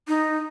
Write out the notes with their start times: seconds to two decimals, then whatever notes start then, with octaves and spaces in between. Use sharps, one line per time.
0.08 D#4